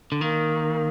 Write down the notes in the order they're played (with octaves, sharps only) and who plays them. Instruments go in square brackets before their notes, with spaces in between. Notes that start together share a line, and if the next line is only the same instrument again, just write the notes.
[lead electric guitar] D3
[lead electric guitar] D#3 [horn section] A#3